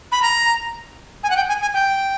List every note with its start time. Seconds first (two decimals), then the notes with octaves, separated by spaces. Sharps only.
0.12 B5
0.22 A#5
1.23 G#5
1.30 F#5
1.36 G5
1.49 G#5
1.61 G#5
1.74 G5